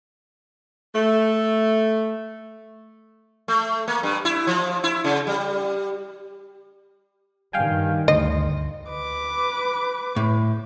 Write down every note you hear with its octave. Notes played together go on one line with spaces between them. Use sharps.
A3
A3
A#3
G2
E4
F3
E4
C#3
G3
G2 D#3 G3 F5 G5 G#5
D2 D#5 C6
B4 D6
A2